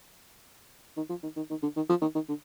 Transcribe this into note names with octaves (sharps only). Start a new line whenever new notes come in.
D#3
F3
D#3
D#3
D#3
D3
D#3
F3
D#3
D#3
D3